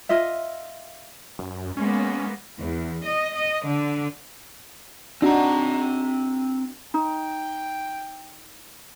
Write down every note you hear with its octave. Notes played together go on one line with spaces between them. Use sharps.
F4 D#5 E5
F#2
G#3 A#3 B3 C#4
E2
D#5
D#5
D3
C4 D4 D#4 F#4 A#5
D#4 G5